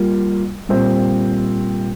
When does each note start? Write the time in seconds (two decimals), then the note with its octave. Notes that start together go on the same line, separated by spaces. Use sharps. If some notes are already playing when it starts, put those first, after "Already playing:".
Already playing: G3 A#3 F4
0.69 A#2 G3 C4 G4 C5